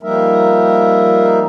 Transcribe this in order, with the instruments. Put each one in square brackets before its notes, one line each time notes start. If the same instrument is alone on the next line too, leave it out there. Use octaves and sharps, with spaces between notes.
[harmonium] F3 G3 A#3 D#4 A#4 E5